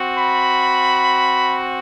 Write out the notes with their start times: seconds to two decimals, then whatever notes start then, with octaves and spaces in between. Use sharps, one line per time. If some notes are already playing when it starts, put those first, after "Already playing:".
Already playing: C4 F#4
0.17 B5